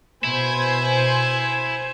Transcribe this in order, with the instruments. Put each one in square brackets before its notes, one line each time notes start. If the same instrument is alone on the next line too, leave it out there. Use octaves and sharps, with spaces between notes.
[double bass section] B2 [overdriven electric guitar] E4 [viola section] C5 G#5